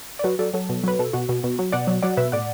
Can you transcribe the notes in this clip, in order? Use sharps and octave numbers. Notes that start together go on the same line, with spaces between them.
D5
F#3 F#4 B4
F#3 A4 D5
F#3 A4
B2
F#3 B4
B2 A4
B2 F#4
B2
B2
F#3
B2 D5 F#5
F#3
F#3 D5 F#5
B2 B4 E5
A2 D5 F#5